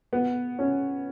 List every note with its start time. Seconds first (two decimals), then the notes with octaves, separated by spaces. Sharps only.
0.13 B3
0.59 C#4